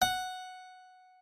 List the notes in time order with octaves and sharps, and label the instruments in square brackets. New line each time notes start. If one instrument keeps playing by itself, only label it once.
[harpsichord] F#5